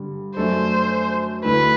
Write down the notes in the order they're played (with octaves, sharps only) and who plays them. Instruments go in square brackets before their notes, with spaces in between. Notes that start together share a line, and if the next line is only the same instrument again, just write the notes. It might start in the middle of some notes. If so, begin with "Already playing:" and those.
Already playing: [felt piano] G2 D3 G3
[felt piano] F#2 F#3 A3 D4 A4 [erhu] C5
[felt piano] D2 D3 A3 E4 [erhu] B4